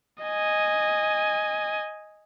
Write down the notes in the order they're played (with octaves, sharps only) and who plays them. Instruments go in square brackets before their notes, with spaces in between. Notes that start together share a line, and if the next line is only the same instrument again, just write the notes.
[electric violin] D#5 G#5